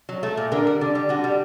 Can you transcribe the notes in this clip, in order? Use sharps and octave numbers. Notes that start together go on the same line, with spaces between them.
F#3
A3
A#2
D3 A#4
G3
D3
G3
D3 F#4
G3